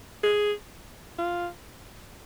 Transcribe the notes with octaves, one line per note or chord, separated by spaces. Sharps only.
G#4
F4